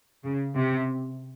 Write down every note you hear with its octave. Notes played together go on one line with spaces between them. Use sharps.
C#3
C3